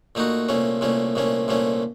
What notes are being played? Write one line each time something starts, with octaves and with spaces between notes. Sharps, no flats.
A#2 A3 D#4 F#4
C2 A#2 A3 C#4
C2 A#2 A3 C#4
C2 A#2 A3 C#4
C2 A#2 A3 C#4